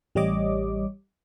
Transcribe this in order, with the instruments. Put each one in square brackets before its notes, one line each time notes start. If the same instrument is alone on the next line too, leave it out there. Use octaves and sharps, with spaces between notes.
[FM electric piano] A1 G3 G4 C#5 D#5 D6